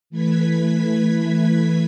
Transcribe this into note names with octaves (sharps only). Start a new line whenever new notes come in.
E3 A3 B4 G#6 B6